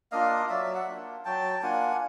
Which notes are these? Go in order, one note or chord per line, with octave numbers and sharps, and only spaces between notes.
A#3 D4 F4 D#5 F5
F#3 D5 E5
E5 F#5
A#3 D4 F4
F#3 G5 A5
A#3 D4 F4 F#5 G#5